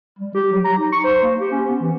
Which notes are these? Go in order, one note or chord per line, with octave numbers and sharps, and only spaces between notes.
G3
G4
F#3
A#5
D#4
C#6
C5
A#3
G4
C#4
B3
E3